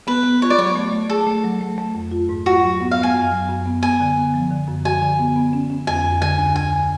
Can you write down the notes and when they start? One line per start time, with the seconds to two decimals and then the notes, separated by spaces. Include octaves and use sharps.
0.07 B3 B4
0.24 B3
0.42 F4 C#5
0.50 D5
0.58 F#3 C#5
0.76 A3
0.92 A3
1.10 G#4 A4
1.27 A3
1.44 F#3
1.61 A3
1.78 A3
1.95 F2
2.12 F4
2.29 G#2
2.46 F4 F#4
2.63 F#3
2.81 B3
2.91 F5
2.97 B3
3.03 G#5
3.14 F#2
3.32 F#3
3.49 F#2
3.66 B3
3.83 B3 G#5
4.00 D3
4.16 B3
4.34 F3
4.51 D3
4.68 F#2
4.85 F#4 G#5
5.02 D3
5.19 B3
5.36 B3
5.53 C#4
5.70 C#4
5.87 F2 G#5
6.04 F2
6.22 D3 G#5
6.38 D2
6.55 D2 G#5